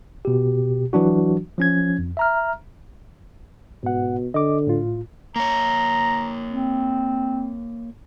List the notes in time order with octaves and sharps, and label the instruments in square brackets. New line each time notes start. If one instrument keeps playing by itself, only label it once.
[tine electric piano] B2 G4
E3 F#3 D4 F#4
F3 C#4 G#6
F2
E5 A#5 F6
[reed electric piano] G#2 F#5 [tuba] B2
[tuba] D3 [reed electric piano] D#5 D6
[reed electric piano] A2 F4
[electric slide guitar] A#3 C#5 [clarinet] A#5
[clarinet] C4